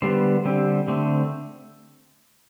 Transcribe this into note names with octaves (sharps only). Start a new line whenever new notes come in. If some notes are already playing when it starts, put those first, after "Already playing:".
D3 G3 B3 C5
D3 G3 C4
D3 A3 C4